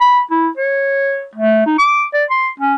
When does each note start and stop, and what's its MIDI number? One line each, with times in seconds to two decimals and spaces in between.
0.01 0.21 83
0.31 0.48 64
0.57 1.27 73
1.35 1.64 57
1.66 1.76 63
1.78 2.05 86
2.14 2.25 74
2.30 2.50 84
2.60 2.76 61